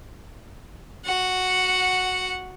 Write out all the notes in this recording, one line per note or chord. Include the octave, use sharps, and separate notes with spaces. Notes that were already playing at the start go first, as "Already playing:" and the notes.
F#4 F#5